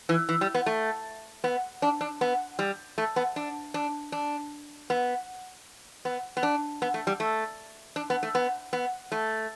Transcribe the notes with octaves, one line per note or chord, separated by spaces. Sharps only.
E3
E3
G3
B3
A3
B3
D4
D4
B3
G3
A3
B3
D4
D4
D4
B3
B3
B3
D4
B3
A3
G3
A3
D4
B3
A3
B3
B3
A3